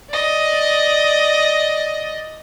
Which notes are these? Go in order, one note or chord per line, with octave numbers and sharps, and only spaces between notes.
D5 D#5